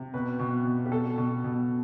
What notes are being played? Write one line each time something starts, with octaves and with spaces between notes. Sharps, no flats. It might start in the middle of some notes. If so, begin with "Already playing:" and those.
Already playing: C3
B2 B4
B2
B2
G4
B2 A4
B2
B2